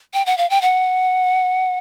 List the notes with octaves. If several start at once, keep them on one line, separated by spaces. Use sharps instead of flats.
G5
F#5
F5
G5
F#5